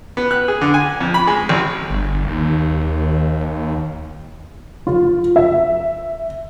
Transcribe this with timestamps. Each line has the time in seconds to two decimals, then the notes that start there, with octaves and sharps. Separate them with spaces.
0.17 B3
0.31 F#6
0.48 G#4
0.61 D3
0.74 G#5
1.00 F2
1.14 B5
1.27 G#3
1.49 A1
1.90 G1
2.27 D#2
4.87 F4
5.36 E5